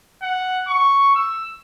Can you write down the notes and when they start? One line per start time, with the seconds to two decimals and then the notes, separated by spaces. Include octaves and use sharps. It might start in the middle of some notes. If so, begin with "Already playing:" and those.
0.22 F#5
0.68 C#6
1.15 E6